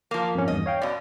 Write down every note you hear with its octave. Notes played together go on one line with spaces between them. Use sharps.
F3 A#3
F2 G#2 C#4
E2 G2 D#5
C#5 F5 G5
F#2 B2 D5